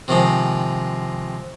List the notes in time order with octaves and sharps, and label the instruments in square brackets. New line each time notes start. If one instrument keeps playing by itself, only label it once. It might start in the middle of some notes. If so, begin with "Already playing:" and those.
[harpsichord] C3 D#3 F3 G#3